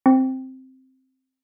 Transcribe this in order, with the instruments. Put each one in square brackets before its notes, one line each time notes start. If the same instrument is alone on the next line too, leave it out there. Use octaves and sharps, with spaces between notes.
[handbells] C4